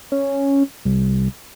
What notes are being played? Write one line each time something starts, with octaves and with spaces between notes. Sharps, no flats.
C#4
C2